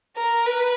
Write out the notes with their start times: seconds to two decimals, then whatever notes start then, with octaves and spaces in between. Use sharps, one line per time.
0.16 A#4
0.46 B4